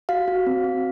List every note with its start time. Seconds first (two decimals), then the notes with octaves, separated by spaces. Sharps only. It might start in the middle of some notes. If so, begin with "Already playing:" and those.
0.09 F#4 F5
0.28 F#4
0.47 C4
0.64 C4